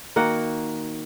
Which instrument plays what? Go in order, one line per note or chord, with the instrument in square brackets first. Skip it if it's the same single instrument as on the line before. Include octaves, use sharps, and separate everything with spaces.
[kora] D#3 A#3 F#4 F#5